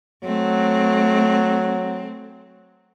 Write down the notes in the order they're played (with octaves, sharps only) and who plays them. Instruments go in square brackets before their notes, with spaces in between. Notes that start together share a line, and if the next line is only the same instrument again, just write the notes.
[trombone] F#3 [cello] A3 C4